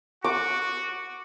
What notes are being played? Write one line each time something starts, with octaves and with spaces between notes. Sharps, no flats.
F#4 D6